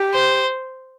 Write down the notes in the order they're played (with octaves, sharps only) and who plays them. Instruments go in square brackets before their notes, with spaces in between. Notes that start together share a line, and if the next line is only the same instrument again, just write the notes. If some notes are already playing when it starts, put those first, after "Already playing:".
Already playing: [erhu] G4
[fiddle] C5